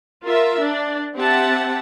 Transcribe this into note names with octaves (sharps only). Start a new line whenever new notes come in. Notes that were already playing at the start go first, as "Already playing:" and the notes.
F4 A#4 E5
D4
C4 G4 E5 F#5 A5